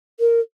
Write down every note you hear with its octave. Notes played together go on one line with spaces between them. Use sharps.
A#4